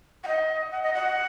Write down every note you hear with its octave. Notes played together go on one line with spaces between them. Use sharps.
F#5
D#5
F#5
D#5
F#5